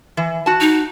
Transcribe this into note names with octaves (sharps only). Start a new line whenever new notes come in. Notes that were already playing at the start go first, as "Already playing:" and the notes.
E3
F#4 A5
D#4